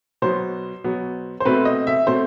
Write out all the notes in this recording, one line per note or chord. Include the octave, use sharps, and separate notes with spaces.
B2 F#3 B3 C5
B2 F#3 B3
C5
B2 A3 C4 B4
D#5
E5
B2 A3 C4 C5